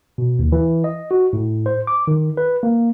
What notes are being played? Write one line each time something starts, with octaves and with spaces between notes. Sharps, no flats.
B2
D#2
E3
D#5
F#4
A2
C5
D6
D#3
B4
A#3